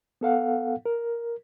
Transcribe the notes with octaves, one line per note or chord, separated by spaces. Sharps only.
B3 A4 F5 F#5
A#4